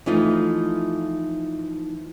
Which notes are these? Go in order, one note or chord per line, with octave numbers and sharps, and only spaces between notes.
E3 F3 A3 D#4 F4